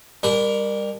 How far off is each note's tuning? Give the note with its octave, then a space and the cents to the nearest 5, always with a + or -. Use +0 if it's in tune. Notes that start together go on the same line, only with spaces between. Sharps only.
G3 +30 D4 -20 A#4 +0